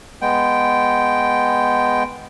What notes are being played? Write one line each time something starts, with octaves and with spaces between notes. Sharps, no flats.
G#3 B3 G5